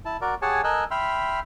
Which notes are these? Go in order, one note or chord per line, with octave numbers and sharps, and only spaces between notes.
E4 A5
F#4 A#4 D5
G4 G#4 C#5 F#5 G#5 A5
A4 A#4 D#5 G#5 E6 F#6
E5 G5 B5 C6 F6